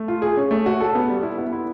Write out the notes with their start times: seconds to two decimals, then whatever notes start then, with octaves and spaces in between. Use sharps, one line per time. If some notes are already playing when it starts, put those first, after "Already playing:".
Already playing: A3
0.08 F4
0.22 G#4
0.37 C#4
0.51 A3
0.66 F#4
0.80 A4
0.95 B3
1.09 G3
1.23 E4
1.38 B3
1.53 E4